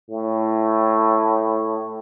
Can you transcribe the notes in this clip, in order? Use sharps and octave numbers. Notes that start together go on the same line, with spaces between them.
A2